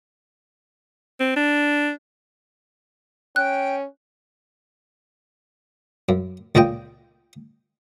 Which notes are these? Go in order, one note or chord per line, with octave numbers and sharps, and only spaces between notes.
C4
D4
C#4 G5 F#6
F#2
C#2 A#2 G#3 D#5 G5